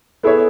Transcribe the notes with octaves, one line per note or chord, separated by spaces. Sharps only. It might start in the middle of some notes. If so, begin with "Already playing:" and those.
B3 E4 G#4 A4 C#5 E5